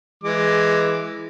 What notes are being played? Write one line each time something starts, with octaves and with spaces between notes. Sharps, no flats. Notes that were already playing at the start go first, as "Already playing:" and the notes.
E3 G#3 D6